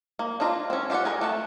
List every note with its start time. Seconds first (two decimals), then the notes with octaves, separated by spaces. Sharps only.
0.19 A#3
0.40 D4 D#4 F4 A#5
0.70 C4 C#4
0.90 F4 G4 C5 D5 F#5
1.05 G#4 A#4 G5
1.21 A3 F#5 A5